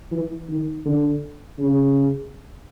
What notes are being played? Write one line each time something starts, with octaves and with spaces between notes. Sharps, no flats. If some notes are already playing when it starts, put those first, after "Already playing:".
E3
D#3
D3
C#3